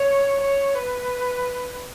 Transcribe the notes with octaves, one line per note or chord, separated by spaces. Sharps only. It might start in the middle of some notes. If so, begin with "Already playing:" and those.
Already playing: C#5
C#5
B4